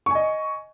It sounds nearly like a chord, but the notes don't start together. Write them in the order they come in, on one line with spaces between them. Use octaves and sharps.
C#6 G#5 D#5